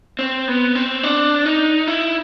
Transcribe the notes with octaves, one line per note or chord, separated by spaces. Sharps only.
C4
B3
C4
D4
D#4
E4